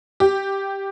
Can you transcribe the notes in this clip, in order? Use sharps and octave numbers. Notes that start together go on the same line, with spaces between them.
G4